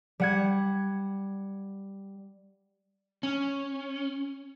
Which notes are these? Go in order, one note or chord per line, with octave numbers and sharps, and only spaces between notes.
G3 F#5 G#6
C#4